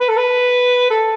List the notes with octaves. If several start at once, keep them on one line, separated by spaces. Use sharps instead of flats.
B4
A4
B4
A4